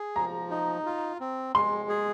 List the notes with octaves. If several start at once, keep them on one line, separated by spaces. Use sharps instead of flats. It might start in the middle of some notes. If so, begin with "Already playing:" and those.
Already playing: G#4
F3 A#5
D#4
F4
C4
G#3 C6
G#4